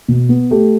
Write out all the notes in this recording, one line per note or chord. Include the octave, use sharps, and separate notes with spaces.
B2
B3
A3 G4